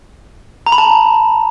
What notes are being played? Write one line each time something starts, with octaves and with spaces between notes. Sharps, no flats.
A#5
B5
A5